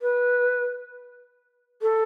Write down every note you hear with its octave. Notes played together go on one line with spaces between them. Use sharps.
B4
A4